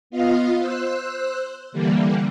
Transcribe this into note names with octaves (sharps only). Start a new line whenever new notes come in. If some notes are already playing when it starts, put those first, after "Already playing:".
B3 F4 D#5 F5
C5 E6 F#6
D3 E3 G3 A#3